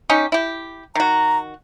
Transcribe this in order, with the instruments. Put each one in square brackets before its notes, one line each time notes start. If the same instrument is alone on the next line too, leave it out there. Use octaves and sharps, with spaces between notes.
[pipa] C#4 D#4 G4
E4 G4
[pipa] D#3 F#4 [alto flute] A#5